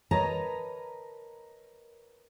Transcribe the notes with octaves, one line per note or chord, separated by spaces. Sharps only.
A#4 B4 C#5 D#5 A5 A#5